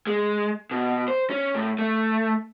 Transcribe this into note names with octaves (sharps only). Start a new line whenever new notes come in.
G#3
B2
C5
C#4
A2
A3